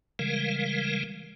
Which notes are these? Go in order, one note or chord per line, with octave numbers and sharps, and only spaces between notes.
C#3 E3 G3 G#3 A#4 F5